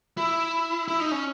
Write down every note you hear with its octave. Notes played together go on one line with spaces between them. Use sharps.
E4
E4
D#4
C#4